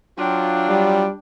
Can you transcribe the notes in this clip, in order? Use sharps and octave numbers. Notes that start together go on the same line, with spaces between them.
F#3 D4 F4 G5
G3